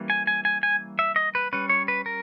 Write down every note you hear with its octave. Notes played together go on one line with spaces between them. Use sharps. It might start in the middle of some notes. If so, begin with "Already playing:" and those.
Already playing: E3 G3 A#3 C#4
G#5
G#5
G#5
G#5
E5
D#5
B4
G3 C#4 B4
C#5
B4
A#4